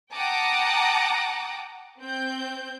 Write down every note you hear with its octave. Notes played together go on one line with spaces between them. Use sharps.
F#5 G5 A5 A#5 D6 D#6
C4 G6